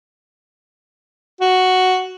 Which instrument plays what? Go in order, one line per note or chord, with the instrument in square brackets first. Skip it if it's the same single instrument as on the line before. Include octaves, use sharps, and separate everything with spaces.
[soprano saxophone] F#4